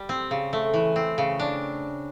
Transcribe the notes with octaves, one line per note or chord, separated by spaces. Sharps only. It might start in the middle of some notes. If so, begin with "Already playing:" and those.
Already playing: G3
C4
C#3
A3
E3
C4
C#3
D4